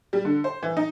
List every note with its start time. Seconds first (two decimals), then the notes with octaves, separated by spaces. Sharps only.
0.13 G3
0.25 D3
0.44 C5
0.63 E3
0.77 D#4